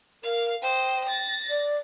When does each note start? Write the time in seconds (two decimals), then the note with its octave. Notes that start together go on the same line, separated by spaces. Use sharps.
0.24 A#4 F5
0.62 C5 D#5 G5
1.05 A6 A#6
1.50 D5